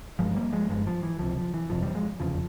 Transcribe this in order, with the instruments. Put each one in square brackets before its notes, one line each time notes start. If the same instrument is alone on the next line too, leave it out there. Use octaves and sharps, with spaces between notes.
[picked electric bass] G1 G2 F3 G#3
G3 A#3
F3 G#3
G1 G2 F3 G#3
F3
E3
C#2 C3 F3
F3
E3
G1 F2 C3 F3
E3 G3
F3 G#3
F1 E2 C#3 F3